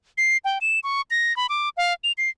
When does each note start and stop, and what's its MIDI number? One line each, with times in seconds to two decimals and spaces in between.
0.18 0.37 96
0.45 0.58 79
0.61 0.80 100
0.84 1.01 85
1.11 1.35 94
1.37 1.47 83
1.49 1.69 86
1.77 1.93 77
2.04 2.12 101
2.18 2.30 96